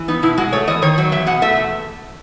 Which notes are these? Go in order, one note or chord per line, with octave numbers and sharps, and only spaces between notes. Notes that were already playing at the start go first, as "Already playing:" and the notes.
Already playing: E3
B3 D#4
B2 E4
G#3 F#4
A3 C#5
E2 D#5
D#3 C#5
F#3
E2 E5
B2 F#5
A3 E5
E2